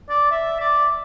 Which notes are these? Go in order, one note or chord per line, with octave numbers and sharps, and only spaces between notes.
D5
E5
D5